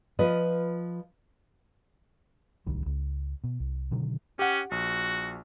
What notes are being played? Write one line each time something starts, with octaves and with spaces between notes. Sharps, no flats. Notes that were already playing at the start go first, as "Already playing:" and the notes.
F3 F4 B4 D#5
D1 C2 D#3 G3
C#2
B2
C2
B2 D3 D#3 F#3
C#4 G4 F#5
A#1 F#4